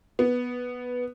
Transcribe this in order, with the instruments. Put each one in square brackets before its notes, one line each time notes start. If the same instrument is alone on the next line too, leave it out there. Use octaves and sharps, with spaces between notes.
[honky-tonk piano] B3